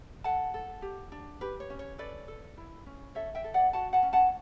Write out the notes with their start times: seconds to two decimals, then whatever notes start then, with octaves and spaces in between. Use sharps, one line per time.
0.24 A4 F#5 A5
0.54 A4
0.82 G4
1.12 D4
1.41 G4 B4
1.60 C#5
1.70 C#4
1.79 C#5
1.98 A4 B4 D5
2.28 A4
2.57 E4
2.86 C#4
3.15 A4 C#5 E5
3.35 E5 G5
3.44 A4
3.54 D5 F#5
3.73 F#4 F#5 A5
3.93 F#5 A5
4.03 C#4
4.13 F#5 A5